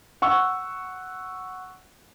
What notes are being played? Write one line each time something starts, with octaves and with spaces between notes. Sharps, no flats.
F#5 C#6 E6